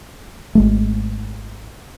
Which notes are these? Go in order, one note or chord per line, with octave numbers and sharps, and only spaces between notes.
G#1 G#3 A3